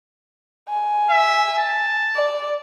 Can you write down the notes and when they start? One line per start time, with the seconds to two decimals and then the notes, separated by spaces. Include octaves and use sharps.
0.69 G#5
1.10 E5
1.58 A5
2.16 D5